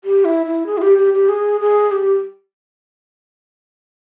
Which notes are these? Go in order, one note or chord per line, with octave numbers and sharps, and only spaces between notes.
G4
E4
E4
G#4
E4
G4
G4
G4
G#4
G#4
G4